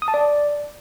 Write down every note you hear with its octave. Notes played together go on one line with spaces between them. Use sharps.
D#6
A5
D5